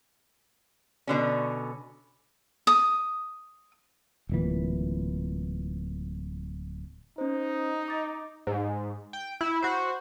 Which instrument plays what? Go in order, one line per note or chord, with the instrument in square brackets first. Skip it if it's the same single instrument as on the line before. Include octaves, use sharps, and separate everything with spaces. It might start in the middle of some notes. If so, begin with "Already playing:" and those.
[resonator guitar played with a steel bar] B2 D3 C#4
[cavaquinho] D#6
[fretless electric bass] D1 A#2 E3
[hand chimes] C#4 C5 [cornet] D#4
[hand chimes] D6 A6
[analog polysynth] G#2
G5
E4
F#4 C5